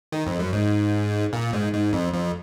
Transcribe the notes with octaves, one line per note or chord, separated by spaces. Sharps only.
D#3
F2
F#2
G#2
A#2
G#2
G#2
F2
F2